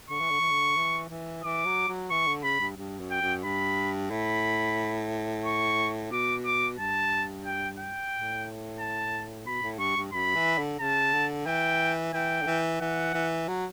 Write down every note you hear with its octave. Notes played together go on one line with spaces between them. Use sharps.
D3 C#6
E3
D3
E3
D3
E3
E3
E3 D6
F#3
F#3
E3 C#6
D3
C#3 B5
G2
G2
F#2
G5
F#2
G2 B5
A2 B5
C#6
B2 D6
D6
G2 A5
G5
G5
A2
A5
B2 B5
A2
G2 C#6
G2
F#2 B5
E3
D3
C#3 A5
D3
E3 G5
E3 G5
D3
E3
E3 F#5
E3
F#3